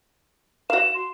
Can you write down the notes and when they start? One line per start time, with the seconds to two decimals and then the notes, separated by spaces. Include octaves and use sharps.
0.70 F#4 F5 E7
0.95 C6